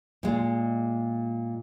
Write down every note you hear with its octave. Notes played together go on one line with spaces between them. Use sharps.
A#2 G#3